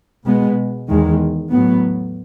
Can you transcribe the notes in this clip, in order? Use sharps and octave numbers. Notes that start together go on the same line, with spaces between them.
B2 G#3 B3
E2 D#3 G#3
A2 F#3 B3